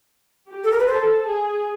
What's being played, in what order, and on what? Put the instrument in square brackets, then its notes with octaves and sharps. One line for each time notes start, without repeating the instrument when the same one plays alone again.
[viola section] G4
[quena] A4
A#4
B4
[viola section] A4 [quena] C5
[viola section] G#4